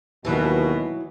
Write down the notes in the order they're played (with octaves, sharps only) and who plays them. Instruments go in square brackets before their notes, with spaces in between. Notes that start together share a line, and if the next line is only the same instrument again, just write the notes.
[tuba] D#2 [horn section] B2 [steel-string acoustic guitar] E3 F#3